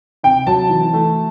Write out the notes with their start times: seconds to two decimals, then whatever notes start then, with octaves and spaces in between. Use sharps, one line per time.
0.23 C3 G5
0.47 F#3 A5
0.70 E3
0.94 A3